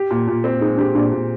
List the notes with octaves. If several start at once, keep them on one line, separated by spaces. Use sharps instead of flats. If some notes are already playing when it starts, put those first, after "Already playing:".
Already playing: G4
A#2
A#2 F4
C4
G#3 D#4
D4 G4
A#2 D4
A#2